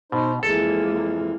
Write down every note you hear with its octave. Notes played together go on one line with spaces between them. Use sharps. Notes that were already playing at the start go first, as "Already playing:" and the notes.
B2 D#4 C5
F2 E3 G#3 A#3 A4